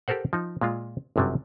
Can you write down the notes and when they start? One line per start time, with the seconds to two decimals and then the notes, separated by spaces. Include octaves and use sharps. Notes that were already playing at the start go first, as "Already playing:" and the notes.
0.08 G4 A4 A#4 C5 F#5
0.33 F3 D#4
0.61 A#2 G#3 F4
1.16 G1 F#2 C3 F#3 G3